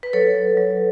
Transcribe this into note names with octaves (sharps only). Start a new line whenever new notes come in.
B4
F#3 A4 C#5
F#3
F#3